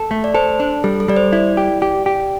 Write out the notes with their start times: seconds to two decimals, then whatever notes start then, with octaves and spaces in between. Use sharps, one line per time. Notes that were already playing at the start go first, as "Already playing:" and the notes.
Already playing: A4
0.11 A3
0.24 D5
0.34 A4 C5
0.60 D4
0.84 G3 A4
1.00 A4
1.08 G3 D5
1.17 C5
1.33 E4 D5
1.57 G4
1.82 G4
2.06 G4